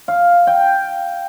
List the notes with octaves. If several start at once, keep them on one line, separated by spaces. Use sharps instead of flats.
F5
G5